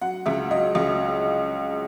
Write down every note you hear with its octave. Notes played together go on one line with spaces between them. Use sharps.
F#3 F#5
C#2 E5
F#3 D#5
C#2